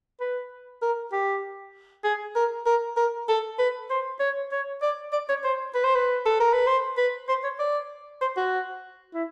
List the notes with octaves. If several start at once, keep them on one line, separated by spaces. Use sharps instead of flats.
B4
A#4
G4
G#4
A#4
A#4
A#4
A4
B4
C5
C#5
C#5
D5
D5
C#5
C5
B4
C5
B4
A4
A#4
B4
C5
B4
C5
C#5
D5
C5
F#4
E4